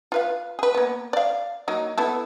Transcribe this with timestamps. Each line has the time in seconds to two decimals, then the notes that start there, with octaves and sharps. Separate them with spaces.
0.12 F4 B4 F5
0.59 G#4 B4
0.75 A#3 B3
1.13 D5 F5
1.68 F#3 A#3 D#4
1.98 B3 E4 A4